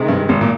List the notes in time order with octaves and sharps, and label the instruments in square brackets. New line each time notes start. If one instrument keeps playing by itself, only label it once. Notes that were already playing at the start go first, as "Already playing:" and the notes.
Already playing: [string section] C3 D#3 G#3
[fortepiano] G2
G#1 G#2
A#2